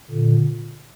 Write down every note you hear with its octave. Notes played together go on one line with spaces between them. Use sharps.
A#2 D3